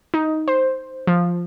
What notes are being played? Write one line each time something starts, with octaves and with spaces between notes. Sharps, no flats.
D#4
C5
F3